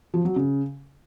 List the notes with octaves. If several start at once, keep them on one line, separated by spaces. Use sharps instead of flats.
F3
F#3
C#3